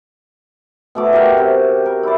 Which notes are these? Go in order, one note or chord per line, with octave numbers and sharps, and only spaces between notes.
B2 A3 D6
F#4 G4 A#4
C3
A#4
E4 D5